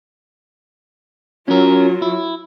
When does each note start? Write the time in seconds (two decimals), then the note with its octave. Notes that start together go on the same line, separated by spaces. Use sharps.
1.48 F#3 C#4 F4 A#4
2.02 E4